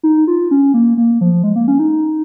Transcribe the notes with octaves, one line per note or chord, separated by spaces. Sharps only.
D#4
F4
C#4
A#3
A#3
F3
G#3
A#3
C#4
D#4